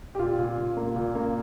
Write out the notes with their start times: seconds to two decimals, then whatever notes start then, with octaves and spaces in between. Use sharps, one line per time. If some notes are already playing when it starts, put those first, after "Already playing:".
0.15 G4
0.19 A#2 F4
0.39 A#2
0.58 A#2
0.77 A#3
0.96 A#2
1.15 A#3